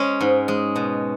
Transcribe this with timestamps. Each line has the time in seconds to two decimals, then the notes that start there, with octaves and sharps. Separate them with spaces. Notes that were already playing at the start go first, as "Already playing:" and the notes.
Already playing: G#3 C#4
0.21 G#2
0.48 G#3
0.76 B2